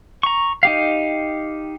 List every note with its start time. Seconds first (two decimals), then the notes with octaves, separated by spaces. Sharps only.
0.23 A#5 C#6
0.63 D#4 G4 F5